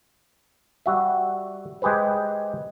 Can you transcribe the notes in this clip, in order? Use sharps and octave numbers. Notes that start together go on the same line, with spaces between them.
G3 F#4 E5
G#3 G4 G#4 B4 C5